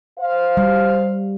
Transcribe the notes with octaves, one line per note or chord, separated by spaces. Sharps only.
C5 F5
G3